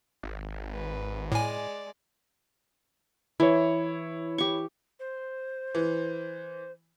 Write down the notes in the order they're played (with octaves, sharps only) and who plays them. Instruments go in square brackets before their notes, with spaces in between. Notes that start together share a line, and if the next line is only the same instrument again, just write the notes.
[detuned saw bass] G#1
[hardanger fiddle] B4
[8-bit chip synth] A2 G#5 [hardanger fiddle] G#3 D5
[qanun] E3 [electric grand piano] E4 C#5
[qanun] G4 C#6
[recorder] C5
[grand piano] E3